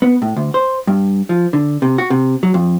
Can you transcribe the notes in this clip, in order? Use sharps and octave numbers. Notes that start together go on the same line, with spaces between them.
B3
A2
D2
C5
G2
F3
D3
C3
F#4
C3
F#3
F2